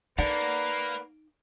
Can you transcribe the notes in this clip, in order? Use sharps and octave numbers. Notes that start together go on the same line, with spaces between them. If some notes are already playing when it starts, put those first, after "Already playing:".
A#3 D#4 A#4 B4 D5 F#5